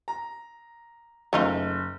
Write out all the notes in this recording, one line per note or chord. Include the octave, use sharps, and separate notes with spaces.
A#5
F#1 A3 D#4 F4